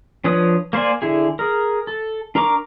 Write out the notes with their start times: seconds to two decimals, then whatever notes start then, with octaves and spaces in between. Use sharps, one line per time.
0.24 F3 D4 B4 C#5 D#6
0.73 A#3 C5 D5 G#5
1.02 D3 E4 G#4
1.39 G#4 A#4
1.87 A4
2.35 D4 A#4 A#5 C#6 D6